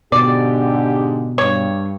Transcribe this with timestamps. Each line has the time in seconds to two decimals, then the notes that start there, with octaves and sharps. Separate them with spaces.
0.12 G#2 B2 D3 G4 D5
1.38 G2 C#5